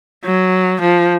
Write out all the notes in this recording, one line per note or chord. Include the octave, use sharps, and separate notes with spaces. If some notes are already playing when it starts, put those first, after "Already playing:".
F#3
F3